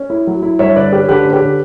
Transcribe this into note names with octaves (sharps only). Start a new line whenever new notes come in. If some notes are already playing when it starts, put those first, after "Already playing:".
Already playing: C#4
E4
F#3
E4
G2 C#5 E5
D3 B4 D5
C#4 G4 B4
D3 G4 B4
C#4
G4 B4
D3